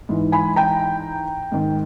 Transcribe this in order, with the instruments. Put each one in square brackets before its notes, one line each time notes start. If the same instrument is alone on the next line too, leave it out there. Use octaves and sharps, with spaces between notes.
[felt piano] G#2 E3
G#5 B5
G5 A#5
G#2 D#3